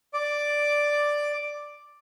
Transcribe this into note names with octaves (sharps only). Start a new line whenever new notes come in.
D5 D6